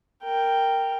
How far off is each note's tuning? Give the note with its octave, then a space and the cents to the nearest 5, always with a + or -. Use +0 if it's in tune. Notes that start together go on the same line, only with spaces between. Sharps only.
A#4 -10 G5 +0